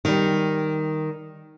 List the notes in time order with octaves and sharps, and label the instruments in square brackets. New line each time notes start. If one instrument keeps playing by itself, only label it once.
[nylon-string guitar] D#3 G3